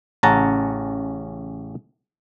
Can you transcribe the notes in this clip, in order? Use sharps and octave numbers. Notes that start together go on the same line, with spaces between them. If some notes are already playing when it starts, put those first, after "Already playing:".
A1 C#3 C#4 F#5 A5 A#5